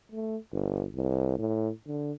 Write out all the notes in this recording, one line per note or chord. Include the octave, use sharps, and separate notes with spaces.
A3
G1
C2
A2
D3